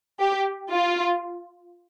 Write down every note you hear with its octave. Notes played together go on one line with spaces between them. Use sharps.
G4
F4